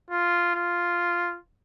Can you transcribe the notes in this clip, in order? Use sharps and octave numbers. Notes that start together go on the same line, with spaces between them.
F4
F4